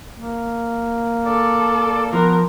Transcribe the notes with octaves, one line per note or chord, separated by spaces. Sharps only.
A#3
A4 D5
F3 B3 A#4